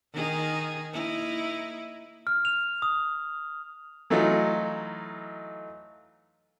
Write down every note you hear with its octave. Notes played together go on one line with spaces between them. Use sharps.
D#3 D#4 G#4
A#3 D#4 E4
F6
F7
D#6
E3 F#3 A3 D#4 F4